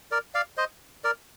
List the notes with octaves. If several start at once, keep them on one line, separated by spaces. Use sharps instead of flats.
A#4 D5
D5 F5
C5 D#5
A#4 D5